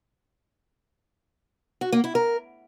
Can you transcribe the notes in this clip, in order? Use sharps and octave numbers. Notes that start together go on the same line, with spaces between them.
F#4
A#3
E4
A#4